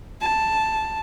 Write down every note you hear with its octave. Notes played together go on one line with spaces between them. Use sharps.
A5